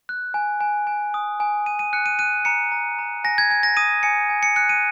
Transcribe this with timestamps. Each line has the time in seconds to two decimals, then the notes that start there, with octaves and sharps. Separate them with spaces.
0.09 F#6
0.34 G#5
0.61 G#5
0.87 G#5
1.14 D#6
1.40 G#5
1.66 G#5 D#7
1.79 D#7
1.93 F#6 C#7
2.06 D#7
2.19 F#6 D#7
2.45 A#5 C#7
2.72 A#5
2.99 A#5
3.24 G#5 A#6
3.38 G#6
3.50 G#5 G#6
3.63 A#6
3.77 D#6 D#7
4.03 G#5 C#7
4.30 G#5
4.43 C#7
4.56 F#6 C#7
4.69 D#7